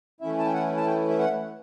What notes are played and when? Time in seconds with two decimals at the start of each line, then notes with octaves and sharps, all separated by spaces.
0.21 E3 A3 C#4 E4 E5
0.39 A5
0.45 G5
0.54 F#5
0.77 A5
0.86 G5
1.09 E5
1.19 F#5